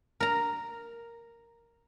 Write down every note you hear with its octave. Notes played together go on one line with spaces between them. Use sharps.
A#4 A#5